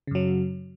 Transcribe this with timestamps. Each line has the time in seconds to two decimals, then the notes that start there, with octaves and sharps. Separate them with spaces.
0.07 C#3
0.11 F#2
0.15 F#3